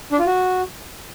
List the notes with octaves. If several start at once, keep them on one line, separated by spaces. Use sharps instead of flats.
D4
F4
F#4